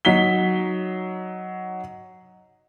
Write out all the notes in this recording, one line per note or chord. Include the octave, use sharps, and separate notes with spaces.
F#3 D#4 B6 G7